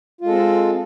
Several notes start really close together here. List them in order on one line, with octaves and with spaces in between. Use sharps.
F4 G#3 A4 C4